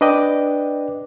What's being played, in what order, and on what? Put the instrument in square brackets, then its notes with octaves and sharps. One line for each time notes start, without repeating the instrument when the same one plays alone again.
[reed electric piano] D4 B4 D5 D#5 G5 D6